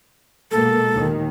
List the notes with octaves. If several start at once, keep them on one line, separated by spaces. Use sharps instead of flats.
B2 G#3 A#3 A4
D#2 A#2 D#3